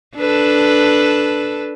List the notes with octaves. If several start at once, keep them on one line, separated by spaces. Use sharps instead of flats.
D4 A4 B4